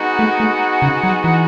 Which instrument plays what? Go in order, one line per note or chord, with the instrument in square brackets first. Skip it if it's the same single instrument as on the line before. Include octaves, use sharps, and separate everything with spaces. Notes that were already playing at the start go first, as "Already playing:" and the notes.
Already playing: [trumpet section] G#3 B3 D#4 F#4
[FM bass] A3
A3
C#3
F#3
E3